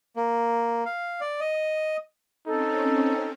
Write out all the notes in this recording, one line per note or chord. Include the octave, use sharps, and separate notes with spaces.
A#3
F5
D5
D#5
C4 C#4 D#4 A4